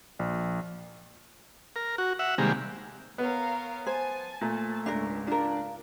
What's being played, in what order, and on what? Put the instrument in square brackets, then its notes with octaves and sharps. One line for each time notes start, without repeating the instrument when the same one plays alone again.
[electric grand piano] A#1
[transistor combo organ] A#4
F#4
E5 F#5
C3 D#3 G3 G#3 A#3
[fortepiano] B3 [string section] A#4 C#5 F5
[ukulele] C5 [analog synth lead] G#5 [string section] A5
[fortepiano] A#2 [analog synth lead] A3
[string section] C#2 G#2 [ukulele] D4 A#4
[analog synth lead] D4 [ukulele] F4 A#4